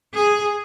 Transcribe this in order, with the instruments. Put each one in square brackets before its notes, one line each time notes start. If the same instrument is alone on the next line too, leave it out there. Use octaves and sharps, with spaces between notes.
[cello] G#4